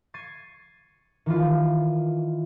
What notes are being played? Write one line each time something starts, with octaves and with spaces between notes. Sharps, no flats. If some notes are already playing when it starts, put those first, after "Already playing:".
C#6 G#6 A6 C7 C#7 D#7
D#3 E3 F4